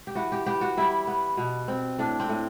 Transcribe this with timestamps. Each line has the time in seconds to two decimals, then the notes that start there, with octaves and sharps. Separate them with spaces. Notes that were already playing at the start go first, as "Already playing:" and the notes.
0.07 G4
0.15 E3 F#4
0.32 G4
0.46 B3 G4
0.61 F#4
0.77 G3 E4
1.07 B3
1.37 B2
1.68 C4
1.98 A2 D4
2.20 C4
2.29 A2